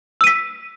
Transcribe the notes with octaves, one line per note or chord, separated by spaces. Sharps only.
E6 B6 D#7